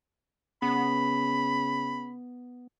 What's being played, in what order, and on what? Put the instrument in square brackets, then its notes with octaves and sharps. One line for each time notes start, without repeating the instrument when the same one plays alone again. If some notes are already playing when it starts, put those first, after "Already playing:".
[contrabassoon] C#3 [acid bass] B3 [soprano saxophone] B5